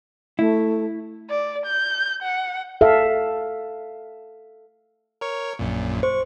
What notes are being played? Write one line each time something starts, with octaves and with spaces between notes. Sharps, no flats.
A3 E4
D5
G6
F#5
A4 E5 F5
A#4 C#5 C#6
A#1 F#2 A#2
C5 C#6